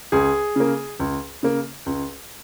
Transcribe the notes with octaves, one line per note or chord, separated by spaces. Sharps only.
C#2 G#4
C#3 A#3
C#2
C#3 A#3
C#2